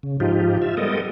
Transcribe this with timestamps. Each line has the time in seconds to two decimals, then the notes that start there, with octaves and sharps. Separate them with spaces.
0.03 C#3
0.20 G#2 F3 D#4 F4 G4
0.62 F4 E5
0.77 G3 G#3 B3 A4 A#4 D#5